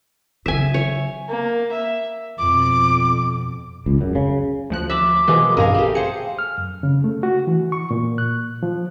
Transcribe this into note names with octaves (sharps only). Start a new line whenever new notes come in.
C#3 F#3 E5 G#5
C#5
A#3
E5
F2 B2 D6
C#2
F#2
C#3
D2 F3 F#6
E5 A5 B5 D6
B2 E3 F3 G#3 A#3
A#1 G2 B2 G#4 A#4 F5
A3 G4
G#4 C5 F5 C#7
F6
F#2
C#3
A3
F#4
E3
C#6
A#2
F#6
F3